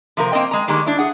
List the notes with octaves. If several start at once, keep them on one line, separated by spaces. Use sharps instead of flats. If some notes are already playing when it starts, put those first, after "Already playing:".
C3 F3 A#3 C4 A#4
A#3 C4 A#4 D#5 G5
G#3 A#5
D#3 G3 G#3 A#3
D4 E4
G#4 F#5